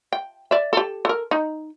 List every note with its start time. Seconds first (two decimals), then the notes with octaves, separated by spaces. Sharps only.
0.13 G5
0.51 D5 E5
0.73 G4 A4
1.05 A4 A#4
1.31 D#4